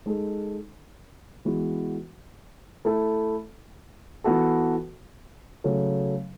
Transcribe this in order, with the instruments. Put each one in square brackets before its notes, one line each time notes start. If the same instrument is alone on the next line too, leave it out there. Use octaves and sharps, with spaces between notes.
[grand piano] G#3 D#4 A4
E3 G#3 B3 F#4
A3 E4 A4
E3 B3 F#4 A4
C#3 F#3 A3